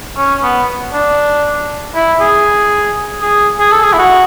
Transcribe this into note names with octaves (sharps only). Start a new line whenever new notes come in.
C#4
B3
D4
E4
G#4
G#4
G#4
A4
G#4
E4
F#4